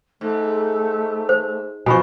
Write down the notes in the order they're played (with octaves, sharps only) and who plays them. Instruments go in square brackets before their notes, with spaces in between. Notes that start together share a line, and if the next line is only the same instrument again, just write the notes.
[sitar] G#2 [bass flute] A3
[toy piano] C5
[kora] B2 F3 [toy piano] G#5 B5 C#6